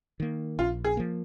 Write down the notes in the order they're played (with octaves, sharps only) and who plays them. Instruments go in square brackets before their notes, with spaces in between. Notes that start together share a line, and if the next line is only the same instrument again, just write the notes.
[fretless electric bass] D#3 A#3
[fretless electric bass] A#1 [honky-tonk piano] F4
[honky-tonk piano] G#4
[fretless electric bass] F3 A#3